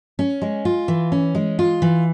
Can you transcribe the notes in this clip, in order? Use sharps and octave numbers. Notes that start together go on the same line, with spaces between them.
C#4
G#3
F4
E3
C#4
G#3
F4
E3